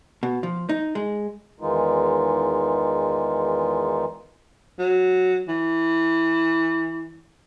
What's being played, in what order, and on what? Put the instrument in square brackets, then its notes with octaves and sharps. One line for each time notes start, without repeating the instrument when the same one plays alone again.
[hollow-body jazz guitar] B2
F3
D#4
G#3
[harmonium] E2 D#3 E3 G#3 D#4 F4
[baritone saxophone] F#3
E3